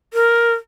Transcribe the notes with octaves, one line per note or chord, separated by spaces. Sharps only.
A#4